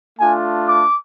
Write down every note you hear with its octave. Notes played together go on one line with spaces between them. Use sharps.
A3 D4 F4 G#5
D6